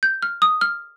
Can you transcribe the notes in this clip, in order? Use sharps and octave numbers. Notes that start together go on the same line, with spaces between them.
G6
F6
D#6
F6